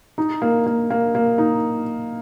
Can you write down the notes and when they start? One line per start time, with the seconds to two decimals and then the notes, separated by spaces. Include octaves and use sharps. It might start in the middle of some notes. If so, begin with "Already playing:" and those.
0.18 D#4
0.42 A#3
0.66 A#3
0.90 A#3
1.15 A#3
1.38 D#4